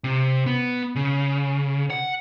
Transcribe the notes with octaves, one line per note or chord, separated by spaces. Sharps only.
C3
B3
C#3
F#5